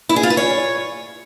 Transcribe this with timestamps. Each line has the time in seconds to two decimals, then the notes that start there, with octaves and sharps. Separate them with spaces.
0.09 E4
0.16 G#4
0.23 F4
0.30 B4
0.37 C#5